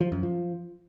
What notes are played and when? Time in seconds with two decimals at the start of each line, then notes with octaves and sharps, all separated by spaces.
0.01 F3
0.12 F#2
0.23 F3